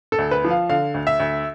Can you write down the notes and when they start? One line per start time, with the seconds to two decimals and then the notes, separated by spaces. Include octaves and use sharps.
0.12 A4
0.19 D2
0.31 B4
0.45 F3
0.50 F5
0.69 D3 F5
0.94 D2
1.07 E5
1.20 D2